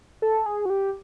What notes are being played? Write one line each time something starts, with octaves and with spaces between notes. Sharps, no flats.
A4
G#4
F#4
G4